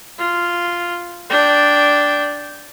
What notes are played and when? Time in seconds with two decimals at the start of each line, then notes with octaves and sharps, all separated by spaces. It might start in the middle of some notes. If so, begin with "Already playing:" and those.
0.18 F4
1.30 D4 G5